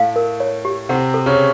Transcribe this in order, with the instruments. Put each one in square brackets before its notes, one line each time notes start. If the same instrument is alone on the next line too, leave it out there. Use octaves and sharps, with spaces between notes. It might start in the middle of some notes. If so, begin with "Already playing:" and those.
Already playing: [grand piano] A2 A3 [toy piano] F5
[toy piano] A#4
C#5
G4
[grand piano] C3 C4 [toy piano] F#5
[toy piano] A4
[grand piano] C#3 C#4